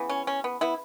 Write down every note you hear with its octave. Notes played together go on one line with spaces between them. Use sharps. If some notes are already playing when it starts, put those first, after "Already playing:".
Already playing: C#3 E3 B3
C#4
C#4
B3
B3 E4